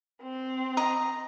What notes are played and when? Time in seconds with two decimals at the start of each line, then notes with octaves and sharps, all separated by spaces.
0.22 C4
0.77 D#5 A#5